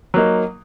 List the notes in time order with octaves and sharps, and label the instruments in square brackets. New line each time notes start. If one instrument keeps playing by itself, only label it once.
[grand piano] F#3 A#3 D#4